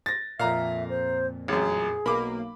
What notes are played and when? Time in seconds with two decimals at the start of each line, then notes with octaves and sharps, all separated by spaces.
0.06 A6 A#6
0.39 F2 A#2 E5 F5 A#5
0.90 C5
1.48 A1 F#2 G#4
2.06 B1 A#3 B5 D6